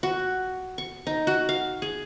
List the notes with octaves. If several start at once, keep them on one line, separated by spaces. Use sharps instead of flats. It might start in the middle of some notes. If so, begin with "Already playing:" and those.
F#4
C#6
D#4
F#4
F5
G#4